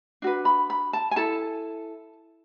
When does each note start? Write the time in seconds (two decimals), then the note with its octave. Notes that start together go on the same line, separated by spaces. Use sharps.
0.22 D4 F#4 B4
0.45 B5
0.70 B5
0.93 A5
1.11 G#5
1.16 E4 A4 A5